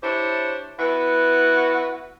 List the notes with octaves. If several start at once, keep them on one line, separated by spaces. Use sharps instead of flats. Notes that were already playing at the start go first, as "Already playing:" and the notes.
D4 E4 G4 C5 C#5
B3 E4 F#4 B4